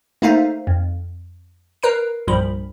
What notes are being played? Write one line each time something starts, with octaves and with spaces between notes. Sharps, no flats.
A3 A#3 D#4 C5 E5 F5
F2
A#4 B4 A#5 C7 D7
C2 G2 A#2 F3 B5